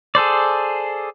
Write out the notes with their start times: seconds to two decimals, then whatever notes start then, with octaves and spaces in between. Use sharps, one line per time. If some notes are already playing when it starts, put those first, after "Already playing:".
0.15 G#4 A4 C5 D5